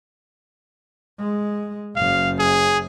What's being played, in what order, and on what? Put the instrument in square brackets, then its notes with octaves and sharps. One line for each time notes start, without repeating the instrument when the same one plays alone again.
[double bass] G#3
[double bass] F#1 F#2 [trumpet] F5
[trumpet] G#4